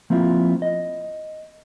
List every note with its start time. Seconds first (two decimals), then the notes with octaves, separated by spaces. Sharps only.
0.10 F3 A#3 C4 E4 F4
0.62 D#5